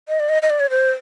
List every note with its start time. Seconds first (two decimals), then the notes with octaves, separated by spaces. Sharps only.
0.08 D#5
0.20 D5
0.29 D#5
0.42 D#5
0.50 D5
0.60 C#5
0.70 C5